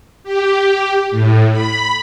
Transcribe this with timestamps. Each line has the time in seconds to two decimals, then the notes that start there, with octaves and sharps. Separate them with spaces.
0.24 G4
1.11 A2
1.51 B5